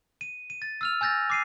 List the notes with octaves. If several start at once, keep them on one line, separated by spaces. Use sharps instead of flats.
D#7
D#7
A6
E6 F6 F7
G#5 E6 G6 A6 A#6
D6 C7 D#7